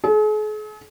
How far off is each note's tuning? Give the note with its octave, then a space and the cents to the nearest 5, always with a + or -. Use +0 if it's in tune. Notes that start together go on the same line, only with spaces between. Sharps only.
G#4 +45